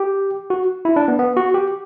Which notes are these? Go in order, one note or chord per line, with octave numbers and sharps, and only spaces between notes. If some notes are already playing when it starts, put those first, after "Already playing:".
Already playing: G4
F#4
E4
D4
B3
B3
F#4
G4